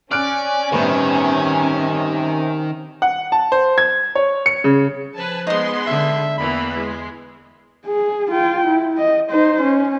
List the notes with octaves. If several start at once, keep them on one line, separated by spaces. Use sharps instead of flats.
C#4 D5 G#5 F6 F#6 D7
G1 A2 C3 D#3 B3
F#5
A5
C5
G#6
C#5
C#7
C#3
F3 B4 G#5 A5
G#3 B3 D#4 C6 D#6
D3 E5
E2 E3 A#3 B3 B5
G#3
G#4
F4 G5
E4
D#5
D#4 C5
C#4